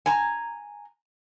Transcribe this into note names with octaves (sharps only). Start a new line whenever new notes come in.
G#5 A#5